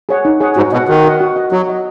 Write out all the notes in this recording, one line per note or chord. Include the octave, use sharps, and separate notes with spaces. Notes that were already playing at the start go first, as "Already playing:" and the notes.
G#4 C#5 F#5
D#4
G#4 C#5 F#5
G#2 F#4
B2 D#5 F#5
D#3 F#4
D#5 F#5
F#4
D#5 F#5
F#3 F#4
D#5 F#5